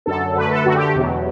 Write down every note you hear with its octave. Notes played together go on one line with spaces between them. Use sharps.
F#2 D3 F#3 A4
F#2 D3 A3 B4
A4
F#2 D3 A3 F#4
G4
E2 B2 F#3